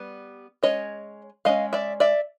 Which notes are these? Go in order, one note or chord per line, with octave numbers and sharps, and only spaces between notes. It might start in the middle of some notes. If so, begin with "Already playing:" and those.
Already playing: G3 B3
G#3 C#4 C#5 D#5
G#3 C#4 D#5 F5
D5 E5
D5 E5